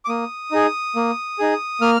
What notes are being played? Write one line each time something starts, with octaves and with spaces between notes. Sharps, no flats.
D6
A#3 D#6
D#4 G#4
A#3
D#4 G#4
A#3 F6